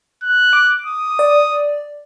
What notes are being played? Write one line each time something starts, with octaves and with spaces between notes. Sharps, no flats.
F#6
D6
D#6
D5